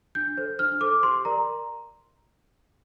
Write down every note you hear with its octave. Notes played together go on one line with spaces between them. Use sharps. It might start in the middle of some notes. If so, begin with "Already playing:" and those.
D4 G6
A4 C5
D4 F6
A4 C5 D6
G4 C6
A#4 D5 A#5